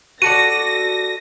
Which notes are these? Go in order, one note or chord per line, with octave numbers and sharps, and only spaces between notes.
F#4 A4 D5 A#6 D#7